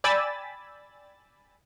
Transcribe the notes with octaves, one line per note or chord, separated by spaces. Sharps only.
D5 G5 G#5 B5 E6 A6